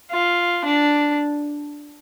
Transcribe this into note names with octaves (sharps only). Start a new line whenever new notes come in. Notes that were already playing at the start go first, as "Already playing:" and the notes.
F4
D4